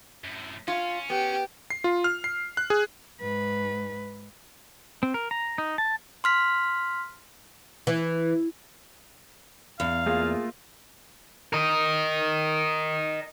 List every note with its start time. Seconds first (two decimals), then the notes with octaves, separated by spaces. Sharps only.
0.24 F#2 A2
0.68 C#4 F4
1.10 B3 G4
1.70 C7
1.84 F4
2.04 F6
2.24 C7
2.57 F#6
2.70 G#4
3.21 G#2 B4
5.03 C4
5.14 A#4
5.31 A#5
5.58 D#4
5.78 A5
6.24 C6 F6 B6
7.87 E3
9.80 E2 F5
10.06 A3 A#3 F4 G#4
11.53 A#4 D#5